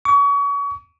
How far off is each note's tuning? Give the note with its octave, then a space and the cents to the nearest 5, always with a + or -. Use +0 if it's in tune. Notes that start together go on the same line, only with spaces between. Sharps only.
C#6 +35